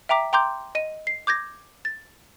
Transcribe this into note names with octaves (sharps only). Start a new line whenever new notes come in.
E5 G5 A#5 D6 B6
G5 A#5 C6 D6 G6
D#5 D#7
C7
D6 G6 G#6 A#6
A6